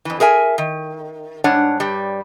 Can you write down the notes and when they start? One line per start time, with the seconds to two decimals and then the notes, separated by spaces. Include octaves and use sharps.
0.05 F2 E3
0.20 G#4 A#4 E5 G#5
0.58 D#3
1.44 G#2 G3 D4 C#5 F#5
1.80 G2 G3